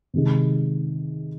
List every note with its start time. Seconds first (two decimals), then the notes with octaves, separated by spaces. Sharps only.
0.14 C3 D#3 G#3